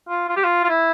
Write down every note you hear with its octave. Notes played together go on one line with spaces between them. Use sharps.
F4
F4
G4
F4
F4
E4